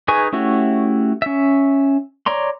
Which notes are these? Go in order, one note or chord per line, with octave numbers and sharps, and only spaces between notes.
D#4 G#4 B4 G#5 C#6
A3 C#4 E4 F#4 G4
C#4 E5
C#5 D5 A#5 C6